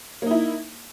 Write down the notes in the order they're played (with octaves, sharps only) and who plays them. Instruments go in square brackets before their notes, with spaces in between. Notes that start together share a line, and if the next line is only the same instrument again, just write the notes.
[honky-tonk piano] A#3
D#4
E4